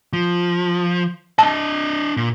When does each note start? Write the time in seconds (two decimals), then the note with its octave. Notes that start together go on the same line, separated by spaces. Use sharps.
0.13 F3
1.39 D4 D#5 A5
2.17 A#2